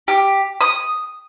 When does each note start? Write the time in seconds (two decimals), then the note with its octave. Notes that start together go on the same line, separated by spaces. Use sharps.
0.08 G4
0.61 D#6